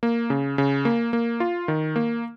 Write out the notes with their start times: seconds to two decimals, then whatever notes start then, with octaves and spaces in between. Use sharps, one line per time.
0.03 A#3
0.30 C#3
0.58 C#3
0.85 A#3
1.13 A#3
1.40 F4
1.68 D#3
1.96 A#3